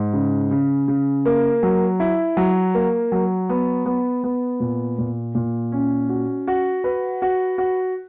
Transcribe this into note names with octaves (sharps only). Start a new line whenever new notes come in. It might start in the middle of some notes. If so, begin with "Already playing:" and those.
Already playing: G#2
C#3
C#3
C#3
A#3
F#3
E4
F#3
A#3
F#3
B3
B3
B3
A#2
A#2
A#2
C#4
F#4
F#4
B4
F#4
F#4